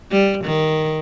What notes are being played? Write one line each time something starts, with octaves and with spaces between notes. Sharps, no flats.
G3
D#3